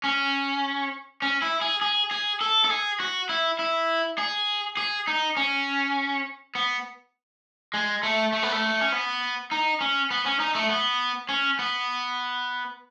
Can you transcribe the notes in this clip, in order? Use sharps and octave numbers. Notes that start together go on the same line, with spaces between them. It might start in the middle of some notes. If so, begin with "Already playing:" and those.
C#4
C#4
E4
G#4
G#4
G#4
A4
A4
G#4
F#4
E4
E4
G#4
G#4
D#4
C#4
B3
G#3
A3
A3
B3
A3
C#4
B3
D#4
C#4
B3
C#4
D#4
A3
B3
C#4
B3